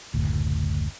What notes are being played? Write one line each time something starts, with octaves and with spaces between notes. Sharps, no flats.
F#1 D2 A2